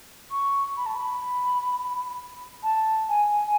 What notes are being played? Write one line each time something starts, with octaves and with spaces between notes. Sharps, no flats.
C#6
B5
A5
B5
A5
G#5